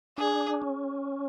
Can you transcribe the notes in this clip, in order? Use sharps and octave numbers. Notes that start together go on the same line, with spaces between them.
D4 G#4
C#4